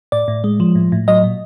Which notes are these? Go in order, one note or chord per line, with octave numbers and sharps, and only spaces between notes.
A2 D5
A2
G#3
F3
A2
A2
F#3 D#5
A#2